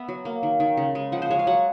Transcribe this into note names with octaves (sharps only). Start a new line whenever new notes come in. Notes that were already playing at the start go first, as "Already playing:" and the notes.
Already playing: B3 E5
F#3
A#3
D#3
D#3
C#3
G#3
F3 F#5
C5
G#3 C#5
F5
F#3 F#5